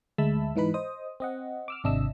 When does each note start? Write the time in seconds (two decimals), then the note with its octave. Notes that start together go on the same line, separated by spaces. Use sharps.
0.18 D2 G#3 E5 A5 B5 E6
0.56 G#2 E3 D#4 B4 B5
0.74 C5 D#5 D#6
1.20 C4 D#5 F#5
1.68 D6 E6 F6
1.84 G#1 C3 D4 D#5 E5 E6